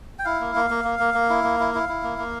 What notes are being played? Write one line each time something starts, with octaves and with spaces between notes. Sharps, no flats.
G5
E4 F5
A#3
A#3
A#3
A#3
A#3
A#3
E4
A#3
E4
E4
E4
A#3
A#3